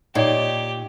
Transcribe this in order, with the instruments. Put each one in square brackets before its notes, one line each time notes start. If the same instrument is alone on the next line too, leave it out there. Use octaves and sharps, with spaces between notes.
[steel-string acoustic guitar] A#2 [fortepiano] D#4 C#5 D5 [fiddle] G4